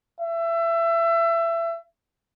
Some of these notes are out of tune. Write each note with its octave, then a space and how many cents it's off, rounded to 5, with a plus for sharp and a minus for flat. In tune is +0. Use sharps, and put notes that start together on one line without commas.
E5 +25